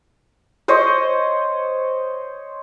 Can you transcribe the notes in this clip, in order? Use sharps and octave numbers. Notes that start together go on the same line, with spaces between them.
C5 C#5 D#5